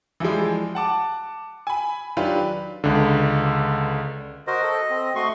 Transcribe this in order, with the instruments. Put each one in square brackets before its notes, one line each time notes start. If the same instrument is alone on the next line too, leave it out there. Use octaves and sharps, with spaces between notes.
[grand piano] E3 F3 G3 G#3
F#5 A5 D6
G#5 B5
D#3 F#3 D4 F4 G4 B4
[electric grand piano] C#2 D3
[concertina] F#4 A#4 C5 [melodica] D#5
[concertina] A4
C4
[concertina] A3 D#5 [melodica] F#4 C6 C#6